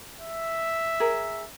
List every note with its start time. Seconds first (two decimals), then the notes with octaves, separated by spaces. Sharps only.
0.19 E5
1.00 G#4 A#4